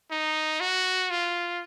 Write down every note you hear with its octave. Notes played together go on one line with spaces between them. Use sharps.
D#4
F#4
F4